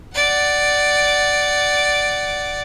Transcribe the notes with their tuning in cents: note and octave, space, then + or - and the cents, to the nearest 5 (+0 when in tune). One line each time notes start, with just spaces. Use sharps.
D5 +0 F#5 +20